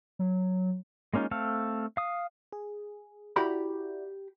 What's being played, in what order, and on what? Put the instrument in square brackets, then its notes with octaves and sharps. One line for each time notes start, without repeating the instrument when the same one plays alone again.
[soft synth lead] F#3
[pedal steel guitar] G#3 A#3 C#4 D#4 F4
A3 C4 A4 F5
F5 D#6
[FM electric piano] G#4
[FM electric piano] E4 F#4 D5 [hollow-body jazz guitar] G4 A#5 B5